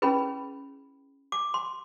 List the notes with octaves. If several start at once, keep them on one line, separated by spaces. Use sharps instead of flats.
C#4 E4 G#4 B4 B5
D6
C6